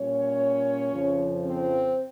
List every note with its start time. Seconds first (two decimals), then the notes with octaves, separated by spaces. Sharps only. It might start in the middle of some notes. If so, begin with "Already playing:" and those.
Already playing: A#2 G3 C#4 C#5
0.92 F2 C#3 F3
1.43 C4 C5